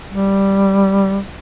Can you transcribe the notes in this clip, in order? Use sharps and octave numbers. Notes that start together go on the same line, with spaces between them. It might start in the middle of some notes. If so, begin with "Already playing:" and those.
G3